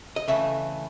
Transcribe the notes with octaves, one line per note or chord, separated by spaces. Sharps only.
D#5
C#3 E3 A3 E5